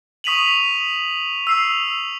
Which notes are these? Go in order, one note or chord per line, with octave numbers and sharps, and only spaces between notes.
C#6 D#6 B6 D#7 F7 F#7
E6 C7 F7